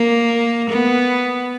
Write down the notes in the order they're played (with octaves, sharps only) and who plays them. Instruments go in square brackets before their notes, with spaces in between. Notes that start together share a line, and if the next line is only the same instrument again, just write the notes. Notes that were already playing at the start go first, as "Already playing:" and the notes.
Already playing: [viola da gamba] A#3
B3